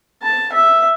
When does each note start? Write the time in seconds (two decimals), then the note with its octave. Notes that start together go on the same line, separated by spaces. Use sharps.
0.23 A5
0.52 E5